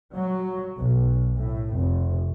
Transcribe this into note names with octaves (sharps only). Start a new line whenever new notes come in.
F#3
B1
A2
F1